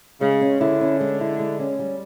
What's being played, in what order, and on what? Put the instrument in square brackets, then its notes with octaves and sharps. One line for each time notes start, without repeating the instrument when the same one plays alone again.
[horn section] C#3 [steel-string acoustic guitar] G#3
[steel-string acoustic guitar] C#4
[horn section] D3 [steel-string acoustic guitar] E4
[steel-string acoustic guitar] C#4
G#3
E4
G#3
C#4
G3